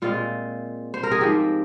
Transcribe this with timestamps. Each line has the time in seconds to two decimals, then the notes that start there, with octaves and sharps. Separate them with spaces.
0.02 A#2 G#3 C4 F4
0.94 C5
1.03 A#4
1.11 G#4
1.21 G#2 F3 C4 G4